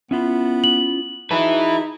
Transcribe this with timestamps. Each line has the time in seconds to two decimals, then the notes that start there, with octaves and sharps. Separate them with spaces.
0.11 B3 C#4 E4 F4
0.64 F#7
1.31 D#4 E4 F#4 G#4 B4 A5